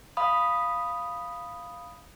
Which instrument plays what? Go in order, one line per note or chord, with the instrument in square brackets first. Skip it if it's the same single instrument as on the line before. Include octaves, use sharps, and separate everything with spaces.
[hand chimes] F5 B5 D#6